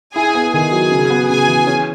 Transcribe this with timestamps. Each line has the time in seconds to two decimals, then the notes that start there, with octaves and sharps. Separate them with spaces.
0.16 E4 G#4 G#5
0.35 B3
0.54 D#3 G#4 G#5
0.72 F#3
0.91 C#3
1.10 B3
1.29 C#3 G#4 G#5
1.48 E3
1.67 C#4